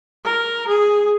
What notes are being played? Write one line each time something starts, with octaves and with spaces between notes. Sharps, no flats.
A#4
G#4